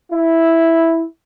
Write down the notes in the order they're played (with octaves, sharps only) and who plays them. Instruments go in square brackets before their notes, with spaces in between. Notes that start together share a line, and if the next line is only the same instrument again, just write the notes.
[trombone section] E4